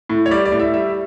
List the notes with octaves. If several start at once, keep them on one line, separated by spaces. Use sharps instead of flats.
A2
C#5
G3 D5
D5
A2
E5
G3 E5